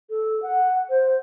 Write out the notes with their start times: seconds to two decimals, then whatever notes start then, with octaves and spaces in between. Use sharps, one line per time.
0.10 A4
0.42 F#5
0.89 C5